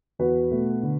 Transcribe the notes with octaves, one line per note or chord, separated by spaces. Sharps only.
E2 F#4 B4
B2 A3
D3